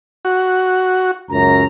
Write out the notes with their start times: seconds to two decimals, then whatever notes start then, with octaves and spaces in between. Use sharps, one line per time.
0.25 F#4
1.31 C#2 F#2 A#5